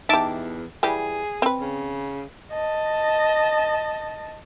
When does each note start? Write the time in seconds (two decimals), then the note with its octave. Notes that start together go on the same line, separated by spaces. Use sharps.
0.09 E2 D#4 G4 E5 A5 D6
0.83 E3 G3 G4 G#4
1.42 C4 B4
1.60 C#3
2.51 D#5 A5